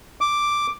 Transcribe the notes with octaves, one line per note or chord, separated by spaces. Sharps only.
D6